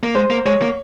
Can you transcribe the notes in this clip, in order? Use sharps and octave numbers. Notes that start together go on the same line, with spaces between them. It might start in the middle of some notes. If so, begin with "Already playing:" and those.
A#3
G#3 C5
A#3
G#3 C#5
A#3